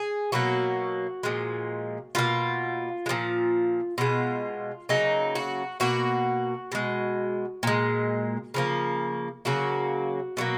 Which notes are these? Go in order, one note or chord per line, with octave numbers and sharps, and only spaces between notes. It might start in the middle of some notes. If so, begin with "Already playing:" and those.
Already playing: G#4
B2 F#3 A#3 F#4
A#2 F3 G#3
B2 A#3 F4
G#3
A#2 F3
B2 G#3 F4
C#3 F#3 A#3 D#4
F#4
B2 A#3 F#4
B2 G#3
A#2 G#3
C#3 F3 A#3
C#3 F#3 A#3 F#4
B2 F#3 A#3